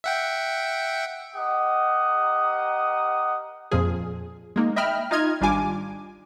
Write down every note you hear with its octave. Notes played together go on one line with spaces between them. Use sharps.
E5 F#5 G5
G4 A#4 D#5 F#5 D#6
F2 A#2 F3 G#4
G#3 A#3 D#4
D#5 E5 G5 B5 F6
D#4 F4 D#5 F6 G#6
G#1 G3 D4 F4 G#5 D6